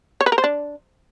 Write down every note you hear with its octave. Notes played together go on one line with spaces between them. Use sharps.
C#5
B4
A#4
C5
D4